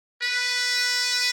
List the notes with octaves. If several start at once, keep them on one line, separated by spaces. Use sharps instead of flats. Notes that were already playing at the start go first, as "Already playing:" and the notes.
B4